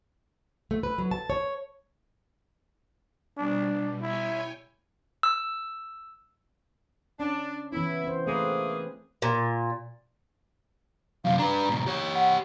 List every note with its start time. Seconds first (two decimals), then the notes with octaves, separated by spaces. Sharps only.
0.71 A3
0.83 B4
0.98 F#3
1.11 A5
1.30 C#5
3.38 B2 G3 D4
4.02 E4 C#5 G5 G#5
5.23 E6
7.20 C#4 D4
7.72 E3 B3 C#4 E4
8.04 C4 C5
8.27 A3 A#3 C4 G#4 B4
9.22 A#2
11.25 F#2 C3 F5
11.39 D4 B4 A#5
11.70 G#2 B2
11.87 G4 C#5
12.15 F#5